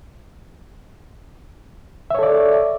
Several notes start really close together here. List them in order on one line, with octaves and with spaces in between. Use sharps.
E5 C#5 A4 D5